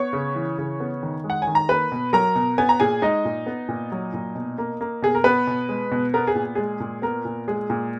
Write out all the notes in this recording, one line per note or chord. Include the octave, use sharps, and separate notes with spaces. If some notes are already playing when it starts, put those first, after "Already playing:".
Already playing: B3 C#5 C#6
C#3
E3
C#3
B3
D#3
G#3
F#5
G#5
D#3
A#5
A#3 B4 B5
B2
F#3 A#4 A#5
B2
B3 G#5
A#5
A#2 G#4 G#5
G#3 D#4 D#5
A#2
B3
A#2
F#3
A#2
B2
A#3
A#3
B2 G#4
A#4
B3 B4
B2
G#3
B2
B3 A#4
G#4
A#2
G#3 G#4
A#2
B3 A#4
A#2
G#3 G#4
A#2